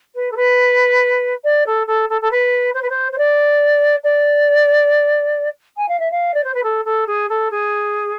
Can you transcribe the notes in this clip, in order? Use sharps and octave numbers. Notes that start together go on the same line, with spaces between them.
B4
A4
B4
D5
A4
A4
A4
A4
B4
C5
B4
C5
C5
D5
D5
G#5
F5
E5
F5
D5
C5
B4
A4
A4
G#4
A4
G#4